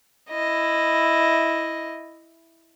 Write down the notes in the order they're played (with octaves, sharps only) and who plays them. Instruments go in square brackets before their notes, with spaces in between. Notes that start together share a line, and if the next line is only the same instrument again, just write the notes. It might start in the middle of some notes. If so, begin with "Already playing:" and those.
[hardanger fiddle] E4 D#5